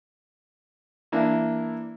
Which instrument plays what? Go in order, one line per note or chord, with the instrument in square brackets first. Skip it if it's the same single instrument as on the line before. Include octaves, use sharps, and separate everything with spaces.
[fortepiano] E3 A#3 D4 E4